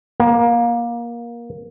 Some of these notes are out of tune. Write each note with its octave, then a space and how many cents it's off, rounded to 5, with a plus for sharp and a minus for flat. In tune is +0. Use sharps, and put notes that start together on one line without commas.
A#3 +20